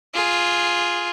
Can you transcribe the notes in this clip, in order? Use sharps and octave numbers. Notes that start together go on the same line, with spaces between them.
F4 G#4